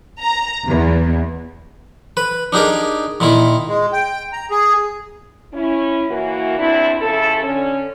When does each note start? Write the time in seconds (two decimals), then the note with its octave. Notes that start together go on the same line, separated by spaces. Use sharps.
0.22 A#5
0.68 E2
2.17 B4
2.53 D4 D#4 G4 G#4 A#4
3.20 A#2 D#3 E4
3.68 G#3
3.93 G5
4.33 A#5
4.51 G#4
5.53 C#4 E4
6.10 E3 A#3 F#4
6.58 E2 C4 D4 E4
7.02 C#3 F3 E4 A4
7.43 D3 C#4